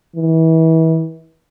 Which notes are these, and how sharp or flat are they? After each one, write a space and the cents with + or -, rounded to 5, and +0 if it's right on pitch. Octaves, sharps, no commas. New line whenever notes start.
E3 -30